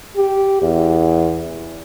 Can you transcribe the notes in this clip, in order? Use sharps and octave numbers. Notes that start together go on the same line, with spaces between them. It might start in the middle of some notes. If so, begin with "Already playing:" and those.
G4
E2